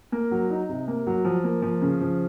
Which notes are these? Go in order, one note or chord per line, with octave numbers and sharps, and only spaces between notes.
A#3
F#3
D#4
C3
A#3
F#3
F3
A#3
F3
C#3
F3